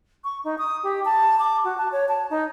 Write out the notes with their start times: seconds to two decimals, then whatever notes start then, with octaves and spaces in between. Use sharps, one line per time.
0.24 C#6
0.44 D#4
0.58 D#6
0.84 G4
1.05 A5
1.39 D6
1.64 F#4
1.78 A5
1.92 C#5
2.09 A5
2.30 D#4